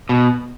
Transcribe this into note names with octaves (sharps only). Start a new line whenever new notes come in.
B2